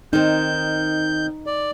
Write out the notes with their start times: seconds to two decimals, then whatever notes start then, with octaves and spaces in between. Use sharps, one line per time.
0.13 D#3 C4 D#4 G6
1.46 D5